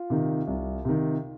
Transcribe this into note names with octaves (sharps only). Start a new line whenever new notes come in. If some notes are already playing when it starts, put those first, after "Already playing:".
Already playing: F4
C3 D#3
C2
C3 D#3